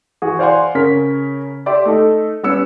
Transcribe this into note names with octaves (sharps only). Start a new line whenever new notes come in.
E3 F#4 G#4
C5 D5 F5 F#5 G#5 C6
C#3 C#4 A#4 C#5 B6
G4 D5 E5 C6 D6
A3 D#4 A4
G3 B3 C#4 E6 C#7